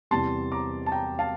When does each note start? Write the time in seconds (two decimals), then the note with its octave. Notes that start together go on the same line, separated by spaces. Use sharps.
0.11 E2 C3 G3 A5 C6
0.52 A#5 D6
0.86 A5
0.92 G5 A#5
1.19 F5 A5